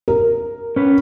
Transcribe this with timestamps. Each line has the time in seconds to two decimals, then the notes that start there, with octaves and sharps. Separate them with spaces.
0.08 A#4
0.76 C#4 B4